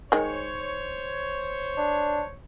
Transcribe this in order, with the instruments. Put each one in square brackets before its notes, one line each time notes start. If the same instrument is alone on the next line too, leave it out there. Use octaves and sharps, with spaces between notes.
[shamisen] D#3 G#3 [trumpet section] C5 C#5
[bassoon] D4